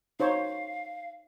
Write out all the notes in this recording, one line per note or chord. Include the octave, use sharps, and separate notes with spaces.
D#4 C5 C#5 F5